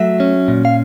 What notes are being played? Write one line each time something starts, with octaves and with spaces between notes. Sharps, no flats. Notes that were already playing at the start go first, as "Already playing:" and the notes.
Already playing: F#3 A3 E5
C#4
A#2
F5